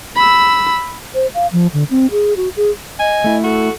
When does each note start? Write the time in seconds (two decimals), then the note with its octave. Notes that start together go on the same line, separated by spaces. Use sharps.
0.16 B5 E6
1.14 C5
1.35 F5
1.53 F3
1.74 D3
1.90 C4
2.11 G#4
2.37 F#4
2.57 G#4
2.99 D#5 G#5
3.24 A3 E4
3.44 F#4 A4